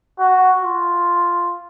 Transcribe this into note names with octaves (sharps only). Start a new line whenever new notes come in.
F#4
F4